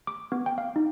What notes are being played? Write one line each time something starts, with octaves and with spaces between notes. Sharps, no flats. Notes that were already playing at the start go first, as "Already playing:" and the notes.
D6
B3
G5
F5
D#4